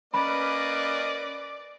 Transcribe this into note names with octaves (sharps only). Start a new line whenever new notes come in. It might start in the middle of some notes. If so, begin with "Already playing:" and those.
A#3 C#4 B4 D5 D#5 B5